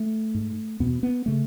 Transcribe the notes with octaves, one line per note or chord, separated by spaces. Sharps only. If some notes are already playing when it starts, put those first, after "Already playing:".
Already playing: A3
G#2
E2 B2 B3
B3
C#3 A3